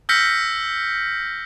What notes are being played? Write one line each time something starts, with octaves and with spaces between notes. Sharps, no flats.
E6 F6 G6 A#6 B6 C#7